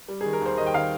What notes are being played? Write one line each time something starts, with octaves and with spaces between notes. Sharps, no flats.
G3
D#3 G#4
A#4
D#2 C5
D#3 D#5
G5
D#3 F5